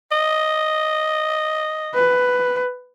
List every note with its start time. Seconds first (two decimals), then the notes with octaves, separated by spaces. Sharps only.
0.11 D#5
1.94 B4